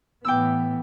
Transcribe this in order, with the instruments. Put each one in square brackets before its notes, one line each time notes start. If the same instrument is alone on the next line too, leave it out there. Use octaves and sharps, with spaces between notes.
[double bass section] A2 E3 B3 [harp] G5 D6 E6